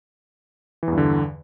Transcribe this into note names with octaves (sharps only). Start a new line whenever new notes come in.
E2 G2 D3 E3